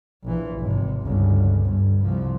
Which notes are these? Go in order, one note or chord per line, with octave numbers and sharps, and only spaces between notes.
A#1 E3
G#1 C3
G1 C#2
G1 G2
C2 F3